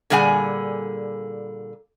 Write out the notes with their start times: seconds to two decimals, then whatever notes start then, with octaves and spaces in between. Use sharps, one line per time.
0.10 A#2 D3 G3 G#4 F#5 G#5